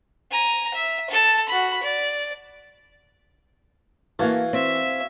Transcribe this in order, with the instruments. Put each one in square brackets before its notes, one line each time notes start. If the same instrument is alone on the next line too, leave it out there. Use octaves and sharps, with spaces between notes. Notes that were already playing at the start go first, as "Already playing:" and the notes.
[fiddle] G#5 A#5
E5
A4 A5
F#4 B5
D5
[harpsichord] E3 [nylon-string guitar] A#3 A5 [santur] F#4 F5 G#5
[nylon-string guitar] C4 [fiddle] E5